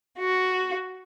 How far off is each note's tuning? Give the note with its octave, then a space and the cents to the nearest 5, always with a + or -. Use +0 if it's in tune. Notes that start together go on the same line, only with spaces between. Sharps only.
F#4 +0